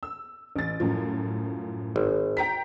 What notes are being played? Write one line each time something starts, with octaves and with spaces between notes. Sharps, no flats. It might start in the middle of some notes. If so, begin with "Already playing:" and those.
E6
A1 A6
F#2 A2 F3
G#1
G5 A#5 B6